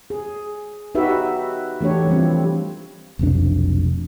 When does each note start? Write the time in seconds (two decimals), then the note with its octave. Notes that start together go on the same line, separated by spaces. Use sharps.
0.10 G#4
0.95 D#4 F#4 G4 B4 E5
1.81 E3 A3 D4 G4 C#5
2.08 F3 G3 C4
3.19 F1 B1 F2 D4